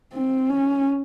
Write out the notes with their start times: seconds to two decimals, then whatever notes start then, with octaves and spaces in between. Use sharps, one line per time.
0.13 C4
0.49 C#4